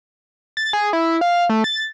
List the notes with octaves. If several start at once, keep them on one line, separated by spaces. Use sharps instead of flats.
A6
G#4
E4
F5
A3
A6